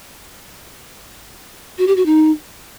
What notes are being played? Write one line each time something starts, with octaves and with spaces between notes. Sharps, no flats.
F#4
G4
F#4
D#4